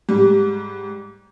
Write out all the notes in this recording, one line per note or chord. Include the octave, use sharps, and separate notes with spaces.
G#2 G3